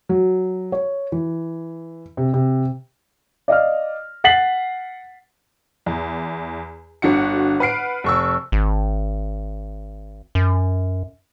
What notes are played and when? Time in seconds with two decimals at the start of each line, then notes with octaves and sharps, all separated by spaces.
0.09 F#3
0.72 C#5
1.12 E3
2.17 C3
2.34 C3
3.48 D5 D#5 F5 F6
4.24 F#5 A6 B6 C7 F#7
5.86 E2
7.02 G1 D3 F#4 C#7
7.60 B4 F#5 F6 C7 D7
8.04 F1 C#6 E6
8.52 G#1
10.35 F#2